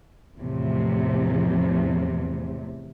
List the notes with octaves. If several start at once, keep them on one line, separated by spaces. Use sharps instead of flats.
E2 A2 C3 F3